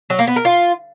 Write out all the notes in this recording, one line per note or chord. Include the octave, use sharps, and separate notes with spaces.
F#3
A#3
B3
A#4
F4